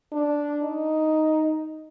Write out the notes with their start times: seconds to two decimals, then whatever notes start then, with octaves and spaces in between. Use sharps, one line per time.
0.12 D4
0.62 D#4